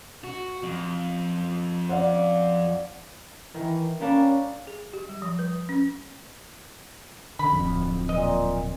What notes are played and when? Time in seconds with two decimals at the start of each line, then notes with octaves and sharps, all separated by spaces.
0.24 F#4
0.63 F2
1.89 D5 F5 F#5
3.54 D#3 E3
4.01 G3 A#3 C#4 D4
4.67 G#4
4.93 G4
5.09 G3
5.22 F3
5.39 B4
5.69 C#4
7.39 D3 B5
7.52 D1 F2
8.09 A#2 D#5